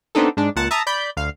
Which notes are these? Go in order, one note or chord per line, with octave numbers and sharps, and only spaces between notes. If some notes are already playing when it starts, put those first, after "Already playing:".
B3 C4 D4 D#4 A4
G#2 D4
C#2 A#2 F#5 A5
E5 A5 A#5 D#6
D5 B5 G6
D2 F5